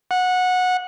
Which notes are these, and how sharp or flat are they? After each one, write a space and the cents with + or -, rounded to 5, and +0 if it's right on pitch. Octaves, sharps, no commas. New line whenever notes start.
F#5 -15